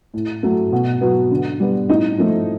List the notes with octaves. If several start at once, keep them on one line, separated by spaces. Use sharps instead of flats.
A2
F#3 A3
B2
F#3 B3
D3
G3 B3
A2 D#4
F3 A3